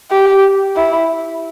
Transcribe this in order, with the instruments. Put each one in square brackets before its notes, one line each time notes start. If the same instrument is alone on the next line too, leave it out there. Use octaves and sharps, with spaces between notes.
[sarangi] G4
E4